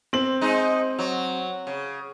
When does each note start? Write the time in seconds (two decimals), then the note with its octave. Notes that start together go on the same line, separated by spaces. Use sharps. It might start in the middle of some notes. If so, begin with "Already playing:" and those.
0.13 C4 F#7
0.41 G#3 D#4 C5
0.99 F#3
1.67 C#3